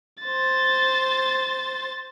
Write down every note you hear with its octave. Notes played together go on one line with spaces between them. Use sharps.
C5 A6